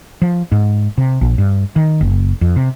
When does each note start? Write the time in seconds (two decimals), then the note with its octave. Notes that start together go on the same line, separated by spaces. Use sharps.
0.22 F3
0.52 G#2
0.98 C3
1.21 A#1
1.38 G2
1.76 D#3
2.01 F#1
2.41 F2
2.56 C3